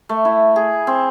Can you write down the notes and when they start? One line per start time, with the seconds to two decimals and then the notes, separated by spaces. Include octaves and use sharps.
0.09 A3
0.25 E4
0.56 G#4
0.87 C4